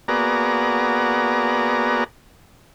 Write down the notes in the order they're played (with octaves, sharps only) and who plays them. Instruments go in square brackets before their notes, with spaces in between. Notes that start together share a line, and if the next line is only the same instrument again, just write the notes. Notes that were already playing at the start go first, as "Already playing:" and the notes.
[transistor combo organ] A#3 B3 F#4 G#4 D5 A#5